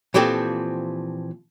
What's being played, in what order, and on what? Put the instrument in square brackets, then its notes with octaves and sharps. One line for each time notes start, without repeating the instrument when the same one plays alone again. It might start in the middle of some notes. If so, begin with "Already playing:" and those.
[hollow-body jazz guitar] A#2 E3 F3 C4 G4 A4